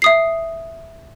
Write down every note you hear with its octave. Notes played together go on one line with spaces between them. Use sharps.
E5 D#6 C7